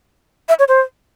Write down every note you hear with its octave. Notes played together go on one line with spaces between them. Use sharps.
E5
C#5
C5